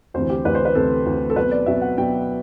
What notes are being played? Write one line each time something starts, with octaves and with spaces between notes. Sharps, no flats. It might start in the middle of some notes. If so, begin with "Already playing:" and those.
D2 C3 E3 C5
G4
D2 C3 E3 B4
C5
B4
D2 C3 E3 A4
D2 C3 E3
A4
B2 F#3 C4 B4
D5
B2 F#3 C4 E5
F#5
B2 F#3 C4 G5